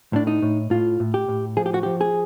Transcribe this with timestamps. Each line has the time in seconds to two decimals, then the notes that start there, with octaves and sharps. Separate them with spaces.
0.13 A2 D4
0.27 D#4
0.42 A2
0.70 A2 F4
1.00 A2
1.14 G4
1.28 A2
1.57 F3 G#4
1.66 G4
1.74 F#4
1.83 F3 G4
2.01 G#4